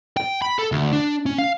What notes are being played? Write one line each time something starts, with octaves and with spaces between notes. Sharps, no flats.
G5
B5
A4
D2
D4
C#4
F5